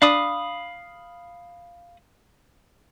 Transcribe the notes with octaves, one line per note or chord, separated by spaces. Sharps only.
D4 F5 B5 D#6